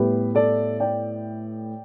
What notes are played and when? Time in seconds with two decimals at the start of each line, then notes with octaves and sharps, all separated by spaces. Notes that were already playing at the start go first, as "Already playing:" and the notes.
Already playing: A2 G3 B3 G4 B4
0.35 A4 D5
0.80 D5 G5